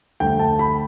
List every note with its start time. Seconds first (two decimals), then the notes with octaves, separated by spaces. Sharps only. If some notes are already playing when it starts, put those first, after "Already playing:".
0.20 D2 D3 F3 A3 G5
0.39 A5
0.59 B5